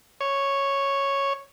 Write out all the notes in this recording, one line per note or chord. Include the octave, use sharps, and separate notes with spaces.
C#5